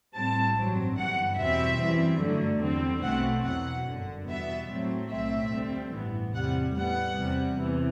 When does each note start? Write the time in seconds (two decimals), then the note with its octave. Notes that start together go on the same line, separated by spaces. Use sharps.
0.14 A2 G3 C4 A5
0.56 A1 G2 F#3 C4
0.97 G1 G2 E3 F#5
1.38 E2 B2 G3 C4 E5
1.80 F#2 E3 G3 C4
2.21 G2 D3 F#3 A3
2.62 E2 D3 G3 C4
3.04 B1 B2 A3 C4 F#5
3.45 E2 B2 F#3 F#5
3.87 G1 F#2 D3
4.28 E2 B2 G3 B3 E5
4.70 A2 F#3 A3 C4
5.11 B1 A2 F#3 A3 C4 E5
5.52 D2 D3 G3 C4
5.93 A1 G2 E3 B3
6.35 E2 C3 G3 F#5
6.76 A2 G3 B3 F#5
7.17 E2 C3 G3
7.58 E2 C3 E3